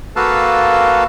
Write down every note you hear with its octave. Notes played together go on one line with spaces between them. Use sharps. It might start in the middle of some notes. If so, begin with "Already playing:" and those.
A#3 F#4 A4 B4 F5 A5